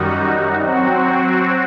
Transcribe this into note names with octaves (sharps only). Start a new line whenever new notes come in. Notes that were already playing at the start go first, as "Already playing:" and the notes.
Already playing: F#2 D#3 G3 D#4 F#4
F#3 C4 F#4